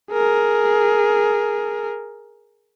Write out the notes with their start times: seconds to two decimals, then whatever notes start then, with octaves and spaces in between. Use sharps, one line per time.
0.12 G#4 A#4